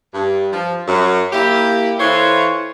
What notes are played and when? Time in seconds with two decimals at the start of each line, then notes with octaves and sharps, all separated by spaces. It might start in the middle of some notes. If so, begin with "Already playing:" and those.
0.14 G2
0.52 F3
0.88 F#2
1.32 A#3 E4 G4
2.00 E3 E4 F4 A4 C5 C#5